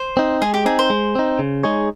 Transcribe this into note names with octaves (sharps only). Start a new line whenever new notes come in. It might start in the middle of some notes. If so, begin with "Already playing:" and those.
Already playing: C5
C4 D#4
G#3 G#4
G4
C4 D#4 G#4
C5
G#3
C4 D#4
C#3
G#3 D#4 G#4 C#5